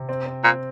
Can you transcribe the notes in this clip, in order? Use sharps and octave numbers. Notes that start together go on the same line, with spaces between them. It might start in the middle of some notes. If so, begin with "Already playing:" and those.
Already playing: C3
C4
C4
A#2 C4